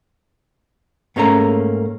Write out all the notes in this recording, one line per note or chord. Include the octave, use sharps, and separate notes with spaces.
G#2 A3 A#3 C#4 A#5